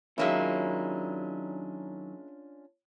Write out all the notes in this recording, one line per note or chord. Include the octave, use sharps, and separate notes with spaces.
D#3 F#3 G#3 A#3 C#4 D4 E4 F4